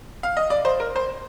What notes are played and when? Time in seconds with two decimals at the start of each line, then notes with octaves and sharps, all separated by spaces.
0.23 F5
0.37 D#5
0.50 D5
0.65 C5
0.80 A#4
0.96 C5